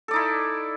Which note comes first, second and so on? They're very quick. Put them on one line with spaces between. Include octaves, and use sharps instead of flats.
A4 D5 D#4 E4